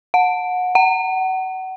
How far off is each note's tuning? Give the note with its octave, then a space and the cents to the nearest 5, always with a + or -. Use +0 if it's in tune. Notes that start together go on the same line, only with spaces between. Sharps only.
F#5 -25
F#5 +30